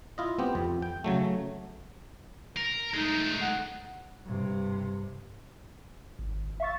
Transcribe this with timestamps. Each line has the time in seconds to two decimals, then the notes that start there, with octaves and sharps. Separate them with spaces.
0.18 E4 F4 D#5
0.39 B3 C4 G4
0.55 F2
0.82 G5
1.04 C#3 F#3 A3
2.57 A#4
2.94 G#3 A3 D#4
3.41 F#5
4.26 G2 C3
6.19 G#1
6.60 E5 F5 C#6 A6